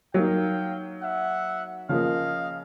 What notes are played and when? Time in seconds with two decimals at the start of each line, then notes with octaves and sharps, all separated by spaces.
0.14 F#3 A#3 D#4 F5 G5
1.01 E5 F#5
1.89 C#3 F3 A#3 D#5 F5